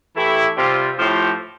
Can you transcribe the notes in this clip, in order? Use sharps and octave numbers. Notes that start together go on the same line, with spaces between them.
E3 A3 E4 G4
C3 G3 C4 F4
A2 F3 A3 C4 G4